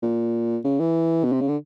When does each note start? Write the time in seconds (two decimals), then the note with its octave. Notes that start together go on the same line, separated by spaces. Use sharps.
0.03 A#2
0.64 C#3
0.80 E3
1.24 B2
1.32 C3
1.41 C#3
1.49 D3